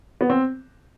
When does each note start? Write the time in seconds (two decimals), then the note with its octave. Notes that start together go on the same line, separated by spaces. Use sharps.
0.21 B3
0.30 C4